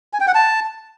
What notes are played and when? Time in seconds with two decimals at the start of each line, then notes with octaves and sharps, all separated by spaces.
0.13 G#5
0.20 G5
0.27 F#5
0.35 A5